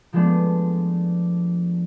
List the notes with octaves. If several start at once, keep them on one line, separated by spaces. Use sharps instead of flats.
F3 G#3 A3 B3 D4